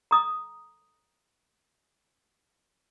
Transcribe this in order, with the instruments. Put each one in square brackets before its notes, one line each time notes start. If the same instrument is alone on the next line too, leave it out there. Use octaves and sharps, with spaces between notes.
[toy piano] A#5 D#6